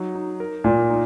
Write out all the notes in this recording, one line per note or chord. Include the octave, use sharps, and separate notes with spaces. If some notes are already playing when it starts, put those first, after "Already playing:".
Already playing: F#3 D#4
D#4
A#4
A#2 F4
D#4